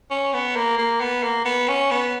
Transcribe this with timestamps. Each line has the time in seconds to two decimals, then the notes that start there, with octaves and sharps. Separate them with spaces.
0.11 C#4
0.33 B3
0.56 A#3
0.78 A#3
1.01 B3
1.23 A#3
1.45 B3
1.68 C#4
1.91 B3